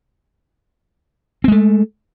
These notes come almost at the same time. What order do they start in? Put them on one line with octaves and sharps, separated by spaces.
C4 G#3 A3